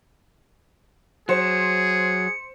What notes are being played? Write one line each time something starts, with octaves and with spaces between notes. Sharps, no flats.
F#3 G#4 C5 C#7